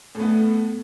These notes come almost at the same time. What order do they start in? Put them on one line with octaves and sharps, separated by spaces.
A2 A3 B3